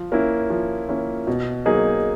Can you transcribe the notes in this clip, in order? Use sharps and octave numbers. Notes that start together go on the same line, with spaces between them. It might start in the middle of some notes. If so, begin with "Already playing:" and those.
Already playing: F3
A#3 C#4 E4
F3
A#3 C#4 E4
B2
F#3 A#3 D#4 G#4